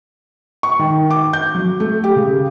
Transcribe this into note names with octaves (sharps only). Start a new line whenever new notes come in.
C#6
D#3
D6
G6
F#3
A3
G4
C#3